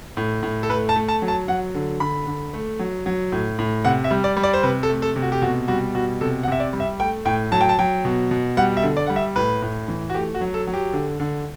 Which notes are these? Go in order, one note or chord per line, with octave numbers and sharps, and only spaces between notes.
A2
A2
A4
A3 B4
A5
A3
A5
F#3
A5
F#3 F#5
D3
D3 B5
D3
A3
F#3
F#3
A2
A2
C3 F#5
E5
G3
D5
G3
D5
C5
C3 B4
A4
A3
A4
C3
F#4
G4
B2 F#4
G3 F#4
B2 F#4
C3 A4
F#5
C3 E5
D5
G3
E5
A3 G5
A2 G5
F#3 A5
G5
A5
F#3 G5
B2
B2
G3 F#5
E5
D3
D5
G3 F#5
E5
A2 B4
A2
E3
F#4
A3 G4
F#4
F#3
A4
F#3
G4
D3
D3